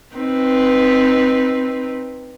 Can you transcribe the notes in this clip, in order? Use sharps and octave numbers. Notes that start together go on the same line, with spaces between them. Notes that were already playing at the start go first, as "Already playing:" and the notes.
C4 D#4 B4